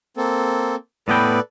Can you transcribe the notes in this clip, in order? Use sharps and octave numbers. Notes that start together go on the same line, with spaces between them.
A#3 C4 A4
A2 B3 A4 B4 D5 G5